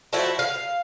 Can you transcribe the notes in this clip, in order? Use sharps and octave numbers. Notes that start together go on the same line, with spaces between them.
F3 A3 E4 F#4
F5